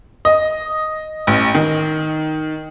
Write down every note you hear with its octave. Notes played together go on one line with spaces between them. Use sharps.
D#5
A1
D#3